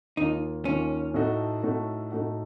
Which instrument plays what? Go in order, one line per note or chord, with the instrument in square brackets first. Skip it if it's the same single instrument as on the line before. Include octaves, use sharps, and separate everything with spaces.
[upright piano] D#2 D#3 A#3 F4 [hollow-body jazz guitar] D#4
[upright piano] D#2 D#3 A#3 F4 [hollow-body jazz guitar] C#4
[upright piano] A2 A3 D#4 F#4
A2 A3 D#4 F#4
A2 A3 D#4 F#4